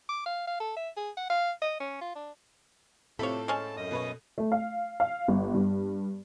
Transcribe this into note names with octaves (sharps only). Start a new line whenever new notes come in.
D6
F5
F5
A4
E5
G#4
F#5
F5
D#5
C#4
F4
D4
A2 C3 C4 F4 A4 C#5 B5
G#3 C#4 A5
F#2 D#5 D#6
B2 B4 C#5
A3
F5
F5
G1
G2